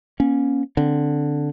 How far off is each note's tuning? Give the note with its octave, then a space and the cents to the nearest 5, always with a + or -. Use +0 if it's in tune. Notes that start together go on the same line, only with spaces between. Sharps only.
A#3 +40 C#4 +0
D3 +0 C4 +0